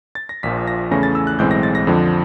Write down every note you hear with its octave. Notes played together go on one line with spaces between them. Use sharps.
A6
A#6
A#1 A#2 F3 B6
A#6
E2 C#3 E3 A3 C#4 A#6
A6
E6
F#6
B1 A2 E3 G#3 C4 G6
A#6
A6
A#6
F2 D3 F3